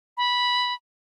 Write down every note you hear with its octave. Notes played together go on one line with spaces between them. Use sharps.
B5